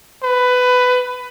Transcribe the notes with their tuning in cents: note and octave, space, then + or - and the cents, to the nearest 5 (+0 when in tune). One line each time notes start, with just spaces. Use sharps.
B4 +15